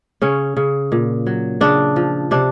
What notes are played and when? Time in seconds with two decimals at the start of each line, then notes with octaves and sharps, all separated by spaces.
0.22 C#3 C#4
0.57 C#3
0.92 A#2
1.27 F#3
1.61 C#3 D4
1.96 F3
2.31 C3 D4